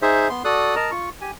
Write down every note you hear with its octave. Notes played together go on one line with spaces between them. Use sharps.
D#4 G#4 C5 E5
B3 C6
F#4 A4 D5 D#6 F#6
A#4 D#5 A5 A#5
F4 C#6
G4 G#5